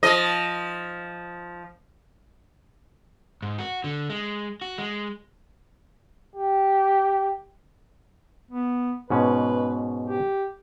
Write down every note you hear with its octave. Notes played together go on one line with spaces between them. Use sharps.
F3 D#5
G#2
F#4
D3
G#3
F#4
G#3
G4
B3
G#2 B2 C#4 B4
G4